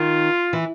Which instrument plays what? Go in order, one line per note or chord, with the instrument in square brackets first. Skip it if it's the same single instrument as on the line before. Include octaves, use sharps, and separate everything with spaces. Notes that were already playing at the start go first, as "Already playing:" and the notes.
Already playing: [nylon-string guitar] D#3 [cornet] F4
[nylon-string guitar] E3